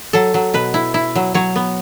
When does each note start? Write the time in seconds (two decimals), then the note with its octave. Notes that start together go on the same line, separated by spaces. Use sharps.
0.13 F#3 A4
0.34 F#3
0.54 B2 B4
0.74 E4
0.94 E4
1.15 F#3
1.34 F#3 C#5
1.56 B3